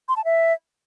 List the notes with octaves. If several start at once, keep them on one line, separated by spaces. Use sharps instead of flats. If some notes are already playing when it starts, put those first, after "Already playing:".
C6
A5
E5